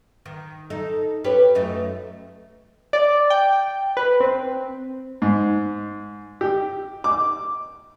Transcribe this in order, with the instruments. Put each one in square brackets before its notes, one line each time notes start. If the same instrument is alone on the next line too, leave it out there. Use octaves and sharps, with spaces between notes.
[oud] D#3
D#4 A4
C#4 G4 B4
F#2 A3 D#4
[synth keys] D5
G5
B4
C4
[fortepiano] G#2
G4
D6